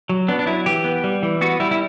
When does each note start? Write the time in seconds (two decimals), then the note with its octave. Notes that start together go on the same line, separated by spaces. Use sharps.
0.09 F#3
0.28 B3 D4
0.39 D4
0.47 F#3 E4
0.66 E3 G4
0.84 B3
1.04 G3
1.23 E3
1.41 B3 F#4
1.60 G3 E4
1.71 E4